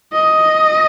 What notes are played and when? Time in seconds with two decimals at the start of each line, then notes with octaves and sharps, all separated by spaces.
0.13 D#5